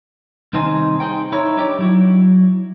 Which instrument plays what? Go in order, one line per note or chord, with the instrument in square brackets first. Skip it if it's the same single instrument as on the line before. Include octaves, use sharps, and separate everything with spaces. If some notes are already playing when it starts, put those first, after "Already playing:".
[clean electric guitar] C2 D#3 C4 D#4 C5 G#5
D#4 G#4 C5 G5
D#4 E4 A#4 C#5
D4 D#4 G4 C#5 D5
F#3 E4 F#4